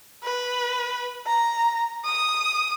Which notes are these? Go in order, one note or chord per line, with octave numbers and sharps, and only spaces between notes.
B4
A#5
D#6